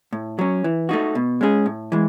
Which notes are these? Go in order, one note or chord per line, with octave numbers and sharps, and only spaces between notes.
A2
F#3 C#4
E3
A3 D#4 F#4
B2
G#3 C#4 G#4
A2
E3 G#3